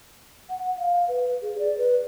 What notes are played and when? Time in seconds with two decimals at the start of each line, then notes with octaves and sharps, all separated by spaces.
0.50 F#5
0.78 F5
1.08 B4
1.42 G#4
1.59 D5
1.78 B4